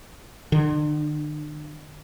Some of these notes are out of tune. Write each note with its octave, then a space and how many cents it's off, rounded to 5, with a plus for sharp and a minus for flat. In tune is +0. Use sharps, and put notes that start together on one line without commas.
D3 +40